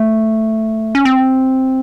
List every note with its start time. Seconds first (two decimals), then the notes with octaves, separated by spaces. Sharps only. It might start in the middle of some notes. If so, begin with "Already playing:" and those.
Already playing: A3
0.95 C#4
1.05 C4